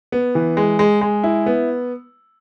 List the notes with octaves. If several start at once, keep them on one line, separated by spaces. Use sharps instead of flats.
B3
E3
G#3
G#3
G#3
E4
B3